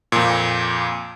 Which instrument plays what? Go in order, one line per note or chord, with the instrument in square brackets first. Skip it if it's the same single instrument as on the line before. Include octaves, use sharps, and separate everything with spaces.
[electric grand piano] F2 A#2